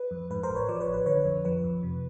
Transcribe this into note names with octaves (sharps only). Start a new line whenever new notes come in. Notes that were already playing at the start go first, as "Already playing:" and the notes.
Already playing: B4
F2
G#2 B4
A#4 C5
A1
B4 C#5
F3 C5 D5
B4 C#5
A1
B4
D3 B4 C#5
F2
F3 B4
F2
C3